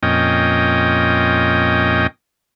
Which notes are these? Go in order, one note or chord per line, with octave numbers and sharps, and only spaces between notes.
F2 A#2 C#4 D#5 G5